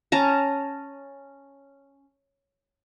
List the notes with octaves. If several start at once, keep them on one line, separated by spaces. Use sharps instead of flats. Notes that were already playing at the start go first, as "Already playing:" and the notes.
C#4 A5 A#5